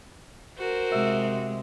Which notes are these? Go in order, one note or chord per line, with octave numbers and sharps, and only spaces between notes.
F#4 A#4 C5
C3 G#3 E5